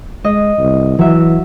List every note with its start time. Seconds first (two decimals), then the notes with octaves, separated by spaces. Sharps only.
0.24 G#3 D#5
0.58 C2
0.99 E3 F#3 E5